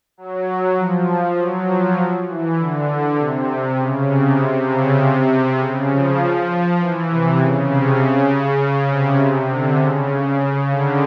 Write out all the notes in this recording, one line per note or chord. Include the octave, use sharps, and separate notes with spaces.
F#3
F3
F#3
F3
E3
D3
D3
C3
C#3
C3
C3
C#3
C3
C3
C#3
F3
E3
C3
C#3
C3
C#3
C3
C3
D3
C#3
C#3
D3